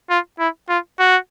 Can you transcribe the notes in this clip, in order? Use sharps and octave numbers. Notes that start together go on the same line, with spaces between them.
F4
E4
F4
F#4